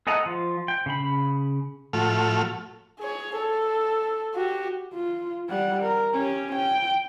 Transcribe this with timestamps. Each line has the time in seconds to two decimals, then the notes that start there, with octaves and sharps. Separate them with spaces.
0.07 G#4 A4 D#5 F#5 A#5
0.26 F3 F4
0.68 G5
0.86 C#3 B5
1.93 A2 F3 A3 F#4 A4 F6
3.00 G#4 C#5
3.36 A4
4.35 F#4 G4
4.94 F4
5.49 G3 F#5
5.82 A#4
6.13 C#4 G4
6.55 G5